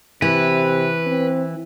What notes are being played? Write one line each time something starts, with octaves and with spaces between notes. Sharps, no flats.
C3 E3 B4
C4